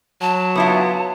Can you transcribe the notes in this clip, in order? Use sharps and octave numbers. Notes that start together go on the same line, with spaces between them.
F#3 A5
B3 E4 F4